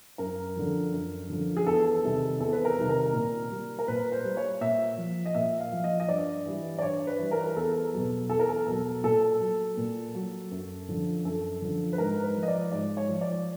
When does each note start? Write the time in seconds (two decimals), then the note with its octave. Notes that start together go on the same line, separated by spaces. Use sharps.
0.18 F#2 A#4
0.56 D3 F3
0.93 F#2
1.30 D3 F3
1.57 G#4
1.66 E2 A4
2.03 C3 D#3 G3
2.40 E2 A4
2.53 B4
2.65 A#4
2.77 C3 D#3 G3
2.89 A#4
3.13 A#2
3.51 G3
3.79 A#4
3.88 A#2 B4
4.12 C5
4.25 G3
4.37 C#5
4.61 A#2 E5
4.98 F3
5.26 D#5
5.34 A#2 E5
5.60 F5
5.72 F3
5.84 D#5
6.00 D#5
6.09 G2 D5
6.46 E3 G3
6.79 D5
6.82 G2 C#5
7.07 B4
7.19 E3 G3
7.31 A#4
7.44 A#4
7.56 E2 A4
7.93 B2 F#3
8.30 E2 A4
8.39 A#4
8.49 A4
8.67 B2 F#3
9.04 A#2 A4
9.40 F#3
9.77 A#2
10.15 F#3
10.51 F#2
10.88 D3 F3
11.25 F#2 A4
11.62 D3 F3
11.93 B4
11.98 G#2 A#4
12.23 B4
12.35 F3
12.43 D#5
12.48 D5
12.72 G#2 D5
12.97 C#5
13.09 F3
13.21 D5